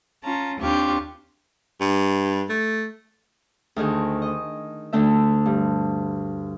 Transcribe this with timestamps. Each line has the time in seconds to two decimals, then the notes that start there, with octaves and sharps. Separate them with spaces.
0.23 C#4 F4 A5 A#5
0.57 D#2 C4 D4 F4 G4 C#6
1.81 G2
2.50 A3
3.76 D2 D#3 G#4
4.22 D#5
4.93 D2 D3 A3 E5
5.46 G2